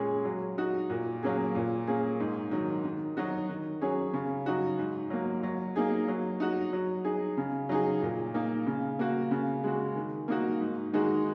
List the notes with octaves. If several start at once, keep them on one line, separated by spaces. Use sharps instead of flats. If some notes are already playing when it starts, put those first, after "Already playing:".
Already playing: A#2 G#3 C#4 G#4
F#3
D#4 F#4
A#2
F#3 A#3 C#4 G#4
A#2
A#3 C#4 G#4
G#2
D#3 F#3
D#3
F#3 D#4 F#4
D#3
F#3 C#4 G#4
C#3
F#3 D#4 F#4
G#2
F#3 A#3
F#3
A#3 D#4 G#4
F#3
D#4 F#4
F#3
D#4 G#4
C#3
F#3 D#4 G#4
A#2
A#3 D#4
C#3
A#3 F#4
C#3
G#3 F#4
D#3
A#3 D#4 F#4
G#2
D#3 G#3 D#4 F#4